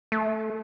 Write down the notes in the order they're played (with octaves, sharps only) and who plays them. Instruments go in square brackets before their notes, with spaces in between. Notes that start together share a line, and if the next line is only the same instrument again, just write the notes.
[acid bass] A3